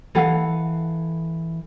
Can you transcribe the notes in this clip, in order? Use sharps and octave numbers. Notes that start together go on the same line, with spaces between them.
E3 A4 F5 F#5